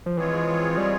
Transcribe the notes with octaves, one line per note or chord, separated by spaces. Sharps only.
F3
E3 G#3 C4 F4 G#4 C#5
G3